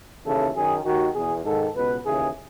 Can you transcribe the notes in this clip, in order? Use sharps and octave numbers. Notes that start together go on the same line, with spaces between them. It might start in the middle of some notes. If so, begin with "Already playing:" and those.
D#2 C#3 E3 A4
F#2 D#3 G#4
D#2 D#3 F#4
E2 B2 G#4
G#2 D#3 A4
C#2 B2 B4
D#2 C#3 E3 G#4